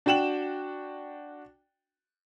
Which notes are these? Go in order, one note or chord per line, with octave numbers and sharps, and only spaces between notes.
D4 F#4 G5 E7 F#7